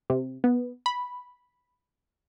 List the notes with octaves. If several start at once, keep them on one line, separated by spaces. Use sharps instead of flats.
C3
B3
B5